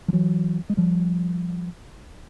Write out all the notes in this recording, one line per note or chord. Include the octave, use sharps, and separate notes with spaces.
F3
E3 F#3
G#3
F3 G3